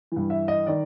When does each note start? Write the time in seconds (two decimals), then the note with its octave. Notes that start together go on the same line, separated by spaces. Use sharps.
0.12 G2 E3
0.30 E5
0.48 D#5
0.66 D#3 D5